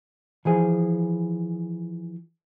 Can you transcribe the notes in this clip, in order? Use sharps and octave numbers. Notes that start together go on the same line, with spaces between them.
E3 F3 G#4